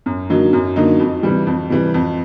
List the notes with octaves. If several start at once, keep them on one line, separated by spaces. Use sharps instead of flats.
F#2
D3 F#3 A#3 D#4
F#2
D3 F#3 A#3 D#4
F2
C3 E3 G3
F2
C3 E3 G3
F2